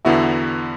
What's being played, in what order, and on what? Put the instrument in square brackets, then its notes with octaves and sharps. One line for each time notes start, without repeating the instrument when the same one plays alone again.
[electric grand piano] E2 D3 B3 F#4 [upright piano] E4